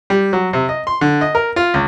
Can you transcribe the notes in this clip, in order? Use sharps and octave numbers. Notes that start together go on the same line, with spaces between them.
G3
F#3
C3
D#5
C6
D3
D#5
A#4
F4
C#2